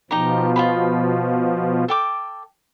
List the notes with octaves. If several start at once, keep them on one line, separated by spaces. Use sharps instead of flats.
B2 F3 D#4 G4 A#5
F4 G#4 B5
A4 G5 D6